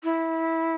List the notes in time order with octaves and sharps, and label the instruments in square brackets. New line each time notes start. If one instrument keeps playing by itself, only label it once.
[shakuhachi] E4